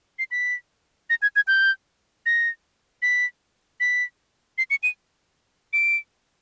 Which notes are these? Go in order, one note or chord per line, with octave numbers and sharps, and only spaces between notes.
C7
B6
A#6
G#6
G#6
G6
A#6
B6
B6
C7
C#7
D#7
D7